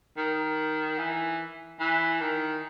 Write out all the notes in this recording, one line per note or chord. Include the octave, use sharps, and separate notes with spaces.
D#3
E3
E3
D#3